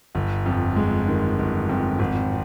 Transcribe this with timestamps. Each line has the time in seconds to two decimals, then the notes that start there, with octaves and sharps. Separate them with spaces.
0.15 G1
0.46 F2
0.76 G#3
1.08 D#3
1.39 G1
1.69 F2
1.99 G#1